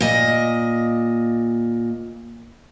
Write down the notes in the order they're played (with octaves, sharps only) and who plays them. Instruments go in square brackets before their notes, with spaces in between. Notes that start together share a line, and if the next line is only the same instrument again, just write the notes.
[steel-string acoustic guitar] A#2 D#5